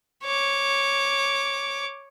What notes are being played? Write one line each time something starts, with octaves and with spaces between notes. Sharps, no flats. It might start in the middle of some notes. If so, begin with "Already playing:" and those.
C#5 D6